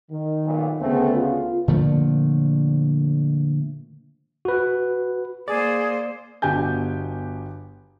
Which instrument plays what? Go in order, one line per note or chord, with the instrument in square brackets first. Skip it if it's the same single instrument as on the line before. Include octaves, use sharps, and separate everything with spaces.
[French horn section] D#3
[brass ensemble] B1 A#2
[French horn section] D2 C#3 B3 [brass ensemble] A3 C4 G#4
[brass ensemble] F4
[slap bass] A#2 D3 F3 A3
[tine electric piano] F#4 B4
[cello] A#3 C5 [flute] G#4 [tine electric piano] D5
[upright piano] G1 B2 G4 G#5 G6